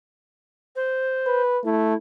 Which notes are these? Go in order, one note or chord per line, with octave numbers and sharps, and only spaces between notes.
C5
B4
A3 E4